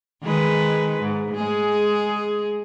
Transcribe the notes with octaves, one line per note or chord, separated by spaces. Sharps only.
D#3 G#3 B4
G#2
G#3 G#4